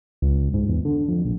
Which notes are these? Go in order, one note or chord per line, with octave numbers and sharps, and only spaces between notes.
C#2
G#2
E2
D3
F2
A#1